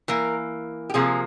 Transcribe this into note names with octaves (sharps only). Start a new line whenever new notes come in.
E3 A#3 A#4
G4
C3 F3 A#3 G#4